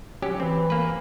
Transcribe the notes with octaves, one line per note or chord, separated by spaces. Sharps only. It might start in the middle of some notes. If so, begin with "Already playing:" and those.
F#3 C#4 G4
E3 C4
A#3 B4